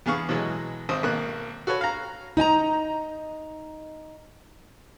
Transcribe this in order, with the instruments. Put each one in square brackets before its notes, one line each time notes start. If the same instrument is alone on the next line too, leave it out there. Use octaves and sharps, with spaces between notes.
[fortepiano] E2 B3 G#4 F5 C#6
B2 E3 F#3 G#3
G#1 C5 D#6
G#1 B2 A#3 F#6
F#4 A4 B4 C#5
F5 A#5
[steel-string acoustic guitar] D#4 D#5 G#5 A#5